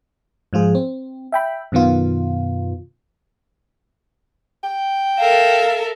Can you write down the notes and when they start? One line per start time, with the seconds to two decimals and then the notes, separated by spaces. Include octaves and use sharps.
0.53 G#2 F3 F4 G#4
0.75 C4
1.32 E5 G5 B5
1.72 F#2 B2 D#3 B3 F4
4.64 G5
5.17 A4 A#4 E5 F5